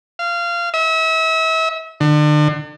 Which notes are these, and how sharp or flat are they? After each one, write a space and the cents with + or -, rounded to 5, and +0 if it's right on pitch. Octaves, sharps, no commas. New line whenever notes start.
F5 -20
E5 -35
D3 +35